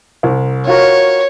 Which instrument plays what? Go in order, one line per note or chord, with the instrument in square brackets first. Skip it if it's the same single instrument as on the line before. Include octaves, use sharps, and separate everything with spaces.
[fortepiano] C2
[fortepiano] F4 F#4 A#4 [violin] C#5